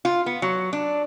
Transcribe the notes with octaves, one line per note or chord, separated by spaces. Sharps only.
F4
B3
F#3
D4